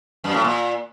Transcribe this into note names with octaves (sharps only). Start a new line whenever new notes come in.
F#2
A2
A#2